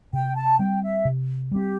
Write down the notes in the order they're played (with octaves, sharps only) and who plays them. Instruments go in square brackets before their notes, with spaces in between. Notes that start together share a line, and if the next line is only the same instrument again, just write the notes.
[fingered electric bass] C3 [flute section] G5
[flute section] A5
[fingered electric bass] G3 C4 [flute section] G5
[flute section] E5
[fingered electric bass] C3
[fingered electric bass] G3 C4 [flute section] G4